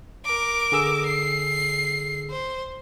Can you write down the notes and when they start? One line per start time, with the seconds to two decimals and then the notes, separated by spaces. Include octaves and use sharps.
0.25 A#4 D6
0.72 D3 G#4 E6
1.06 C7
2.30 C5